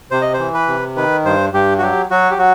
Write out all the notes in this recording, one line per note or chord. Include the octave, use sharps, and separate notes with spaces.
C3 C5
D#5
C5
E3
B4
C3
D#3 B4
G2 C5
G2 G4
F#4
F#3 G4
F#3 F#4
G4
F#3 F#4